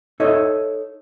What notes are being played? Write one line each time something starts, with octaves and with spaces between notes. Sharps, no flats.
D#4 A4 C#5 D#5 E5